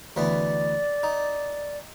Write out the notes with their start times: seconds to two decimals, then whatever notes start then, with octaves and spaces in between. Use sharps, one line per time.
0.16 D2 E3 B3 D5
1.03 D#4